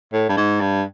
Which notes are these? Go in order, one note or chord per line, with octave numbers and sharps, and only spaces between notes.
A2
G2
G#2
G2